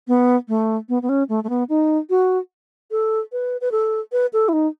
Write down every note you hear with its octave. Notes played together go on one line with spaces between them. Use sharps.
B3
A3
B3
B3
C#4
A3
A3
B3
D#4
F#4
A4
B4
B4
A4
B4
A4
E4
D#4